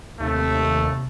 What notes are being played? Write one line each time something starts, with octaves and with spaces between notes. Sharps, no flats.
D#2 C3 A3